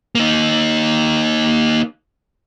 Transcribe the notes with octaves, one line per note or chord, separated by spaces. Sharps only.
A#3 D#4